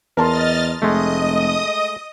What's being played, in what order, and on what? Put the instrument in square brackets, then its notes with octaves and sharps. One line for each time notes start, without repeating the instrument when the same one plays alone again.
[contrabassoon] E2 [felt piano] A#4 A5 C6 [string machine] D#5 F6 A6
[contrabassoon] F1 [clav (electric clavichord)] G#3 A3 [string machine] D#5 D#6